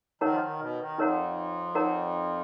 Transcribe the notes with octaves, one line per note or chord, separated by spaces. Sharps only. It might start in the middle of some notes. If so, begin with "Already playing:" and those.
D#3 D#4 A#4 C#5 F#5 A#5
F3
D#3
B2
D#3
F2 D#4 A#4 C#5 F#5 A#5
D#4 A#4 C#5 F#5 A#5